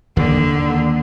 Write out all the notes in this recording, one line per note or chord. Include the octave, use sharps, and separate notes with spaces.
D#2 D3 D#3 A#3